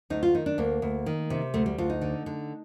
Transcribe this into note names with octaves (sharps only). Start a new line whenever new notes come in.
D2 D#4
F4
D#3 D#4
D4
D2 A#3
D2
D#3
C3
D2 A3
G3
D2 F4
D#4
D3
D3